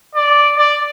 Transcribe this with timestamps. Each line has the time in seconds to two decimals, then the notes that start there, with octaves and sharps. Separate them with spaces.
0.15 D5
0.57 D5